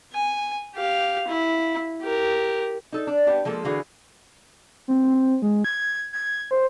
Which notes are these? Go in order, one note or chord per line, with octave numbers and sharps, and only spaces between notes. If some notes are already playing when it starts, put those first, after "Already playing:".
G#5
G4 F5
E4
G4 A#4
D#4 A4
D4
B3 G4 A5
F3 G#3 A#3 A4
D3 E3 F#4 G#4 F5
C4
C4
G#3
G#6
G#6
C5